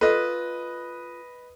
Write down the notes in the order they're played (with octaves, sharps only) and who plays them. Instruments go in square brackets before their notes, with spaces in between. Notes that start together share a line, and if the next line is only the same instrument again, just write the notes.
[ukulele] F4 A4 [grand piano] B4 D#5